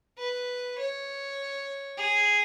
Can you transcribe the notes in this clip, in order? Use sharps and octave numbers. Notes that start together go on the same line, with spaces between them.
B4
C#5
G#4